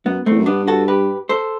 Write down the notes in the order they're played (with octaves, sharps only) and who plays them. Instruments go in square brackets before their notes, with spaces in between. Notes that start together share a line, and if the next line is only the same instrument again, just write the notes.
[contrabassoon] F#2 [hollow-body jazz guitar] B3
[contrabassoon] E2 [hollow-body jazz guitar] A3 C4
[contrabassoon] F#2
[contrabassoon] G2 [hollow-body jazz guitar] B3 D4
[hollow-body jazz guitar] F#4 A4
G4 B4
A4 C5